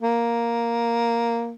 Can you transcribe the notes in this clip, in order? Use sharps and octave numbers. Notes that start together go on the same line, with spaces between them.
A#3